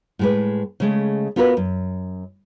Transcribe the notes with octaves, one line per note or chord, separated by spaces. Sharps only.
A2 G#3 B4
C#3 G#3 A3
B3 F4 F#4 A#4 B4
F#2